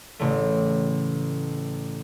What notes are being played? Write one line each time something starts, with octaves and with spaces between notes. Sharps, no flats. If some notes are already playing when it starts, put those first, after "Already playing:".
A1 C#3 A3